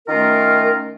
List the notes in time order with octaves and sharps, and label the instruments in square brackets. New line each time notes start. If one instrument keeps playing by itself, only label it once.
[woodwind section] D#3 A3 C#4 F4 A#4